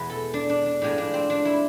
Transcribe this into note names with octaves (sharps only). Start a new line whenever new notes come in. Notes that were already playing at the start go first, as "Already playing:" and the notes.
Already playing: E2 B2 G#3 B3 B4
A4
D4
D4
D4
A2 F3 G#3 D4
D4
C4
D4
E4